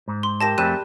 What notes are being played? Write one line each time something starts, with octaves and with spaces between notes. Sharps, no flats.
G#2
C6
G4 A#4 E5 A5 A#6 E7
F2 G3 A3 C4 G#4 F#6 D#7 E7